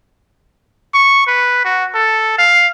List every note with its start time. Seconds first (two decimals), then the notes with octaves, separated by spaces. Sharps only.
0.94 C#6
1.27 B4
1.65 F#4
1.95 A4
2.38 F5